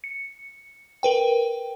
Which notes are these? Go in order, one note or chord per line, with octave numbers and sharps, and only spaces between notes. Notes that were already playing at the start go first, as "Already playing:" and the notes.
C#7
A#4 B4 G5